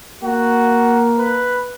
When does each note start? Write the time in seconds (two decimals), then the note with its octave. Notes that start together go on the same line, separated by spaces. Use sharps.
0.24 A#3 F#4
1.18 B4